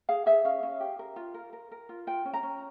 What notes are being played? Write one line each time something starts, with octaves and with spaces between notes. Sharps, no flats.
G#4 F5
G#4 E5
C#4 F5
C#4
G4
A#4
F4
A#4
A#4
A#4
F4
F4 G5
C#4
A#5
C#4